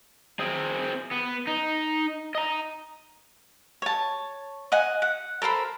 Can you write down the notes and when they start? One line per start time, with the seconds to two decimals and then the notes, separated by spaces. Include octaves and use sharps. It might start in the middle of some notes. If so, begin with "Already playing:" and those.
0.40 C4 G#4
1.12 B3
1.47 D#4
2.35 D#5 A#5
3.82 C#5 A5
4.72 D#5 F#5 G#5
5.02 F#5
5.42 A4 A#4 C5 B5